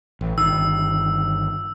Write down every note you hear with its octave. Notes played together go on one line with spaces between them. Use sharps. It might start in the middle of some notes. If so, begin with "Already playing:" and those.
A1
G1 D#3 E6